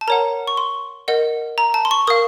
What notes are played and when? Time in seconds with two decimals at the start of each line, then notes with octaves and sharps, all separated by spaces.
0.01 A5
0.08 A#4 C#5 F#5 A#5
0.47 C#6
0.57 C6
1.08 A#4 D#5 F#5
1.58 A#5
1.74 A5
1.85 C6
1.91 C#6
2.07 A#4 F5 D#6